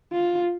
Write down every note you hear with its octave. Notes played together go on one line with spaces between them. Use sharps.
F4